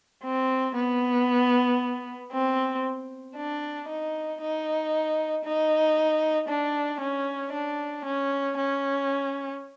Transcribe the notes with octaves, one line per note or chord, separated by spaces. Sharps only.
C4
B3
C4
D4
D#4
D#4
D#4
D4
C#4
D4
C#4
C#4